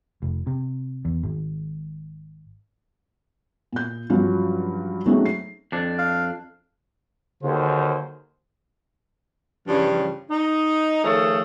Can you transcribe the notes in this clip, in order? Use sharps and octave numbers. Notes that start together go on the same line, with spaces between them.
F1
C3
E2
G#1
A#2 G6
G2 F3 F#3 C#4 F4 F#4
F#3 G#3 A3 C4 C#4 D#4
C7
F2 D4
F5
D#2 D3 F#3 C5
G2 C#3 E3 F3 G3 C#4
D#4
D#3 F3 A3 G#4 A4 C#5